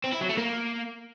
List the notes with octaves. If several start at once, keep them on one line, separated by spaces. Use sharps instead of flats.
C4
E4
F#3
A3
A#3